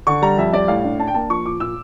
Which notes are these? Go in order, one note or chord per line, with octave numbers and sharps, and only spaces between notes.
D3 C#6
G3 A#5
F2 E5
G3 D5
A2 F5
D4
D4 A5
G5
A#3 A5
F3 C#6
A#2 D6
A#2 E6